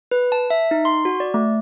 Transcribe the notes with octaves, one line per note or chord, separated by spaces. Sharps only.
B4
A5
E5
D#4
C6
F#4
D5
A3